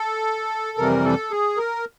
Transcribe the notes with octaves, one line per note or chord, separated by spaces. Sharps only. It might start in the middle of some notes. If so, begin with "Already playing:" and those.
Already playing: A4
F2 C3 E3 G3 A#4
A4
G#4
A#4